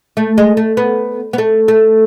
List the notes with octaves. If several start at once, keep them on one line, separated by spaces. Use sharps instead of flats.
A3
G#3
A3
B3
B3
A3
A3